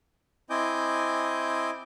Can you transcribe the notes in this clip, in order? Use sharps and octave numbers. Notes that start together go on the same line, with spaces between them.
C4 E4 D#5 G#5 D6 G6